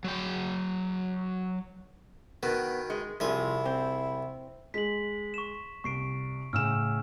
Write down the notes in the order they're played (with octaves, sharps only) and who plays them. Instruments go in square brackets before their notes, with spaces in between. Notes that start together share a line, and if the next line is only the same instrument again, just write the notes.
[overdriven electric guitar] F#3 G5
[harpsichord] B2 D#3 [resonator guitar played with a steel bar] B3
[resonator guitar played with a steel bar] G#3
[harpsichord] C2 G#4 [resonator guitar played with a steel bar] C3 F3 [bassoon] E4
[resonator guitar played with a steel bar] C4
[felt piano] G#3 [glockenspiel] B6 F#7
[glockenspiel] C#6 E7
[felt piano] C2 [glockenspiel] C#6 C7 D7
[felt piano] A2 C#3 E7 [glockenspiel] G#5 E6 F6